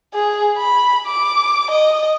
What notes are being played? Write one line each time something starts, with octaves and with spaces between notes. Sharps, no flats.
G#4
B5
D6
D#5